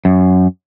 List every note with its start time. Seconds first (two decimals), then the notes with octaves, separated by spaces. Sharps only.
0.05 F#2